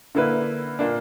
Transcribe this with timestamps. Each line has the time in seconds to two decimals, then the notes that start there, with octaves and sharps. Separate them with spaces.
0.15 D3 A#3 E4 B4
0.79 A#2 A#3 D4